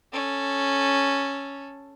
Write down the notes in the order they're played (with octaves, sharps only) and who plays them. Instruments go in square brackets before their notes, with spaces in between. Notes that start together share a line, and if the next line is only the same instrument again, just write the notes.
[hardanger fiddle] C#4 A4